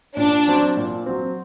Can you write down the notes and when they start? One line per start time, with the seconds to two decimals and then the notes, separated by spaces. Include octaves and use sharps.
0.17 A#2 D4
0.47 F#3 C4
0.77 A#2
1.06 F#3 C4